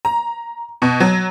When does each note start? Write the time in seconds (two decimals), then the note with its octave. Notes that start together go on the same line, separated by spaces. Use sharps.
0.05 A#5
0.82 B2
1.00 F#3